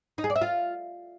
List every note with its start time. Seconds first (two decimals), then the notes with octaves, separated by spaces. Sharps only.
0.18 D#4
0.24 G#4
0.30 D5
0.36 E5
0.41 F4